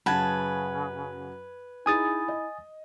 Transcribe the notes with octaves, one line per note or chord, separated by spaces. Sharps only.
F#2 C#3 B4 F#5 A5 G#6
D#4 E4 G#4 G#5 D#6 A6
D#5